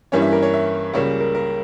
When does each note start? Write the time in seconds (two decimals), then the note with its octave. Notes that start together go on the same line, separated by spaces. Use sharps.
0.12 G2 E3 G3 A#3 C#4 C#5
0.22 E5
0.32 A#4
0.42 C#5
0.54 E5
0.94 C#2 C#3 G3 A#3 C#5
1.20 A#4
1.35 A#4